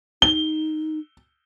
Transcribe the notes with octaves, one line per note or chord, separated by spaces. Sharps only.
D#4 G7